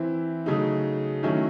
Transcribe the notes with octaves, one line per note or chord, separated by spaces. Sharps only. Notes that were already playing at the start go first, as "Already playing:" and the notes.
Already playing: E3 C4 E4
C#3 F#3 A3 D#4
D#3 F#3 A3 C#4 E4